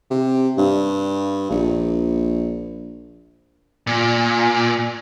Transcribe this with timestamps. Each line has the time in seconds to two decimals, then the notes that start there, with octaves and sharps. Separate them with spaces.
0.10 C3
0.57 G2
1.51 A#1
3.87 A#2